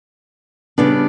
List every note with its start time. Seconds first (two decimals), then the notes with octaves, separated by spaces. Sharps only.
0.78 C#3 G3 B3 D4